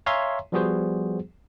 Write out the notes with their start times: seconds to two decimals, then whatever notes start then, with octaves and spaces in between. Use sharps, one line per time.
0.06 C#5 E5 F5 G#5 A#5 C6
0.52 F3 G3 B3 F#4 G#4 C5